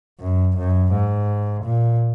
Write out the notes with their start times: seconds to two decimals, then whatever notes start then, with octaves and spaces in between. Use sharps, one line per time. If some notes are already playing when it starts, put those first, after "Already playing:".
0.20 F#2
0.57 F#2
0.92 G#2
1.64 A#2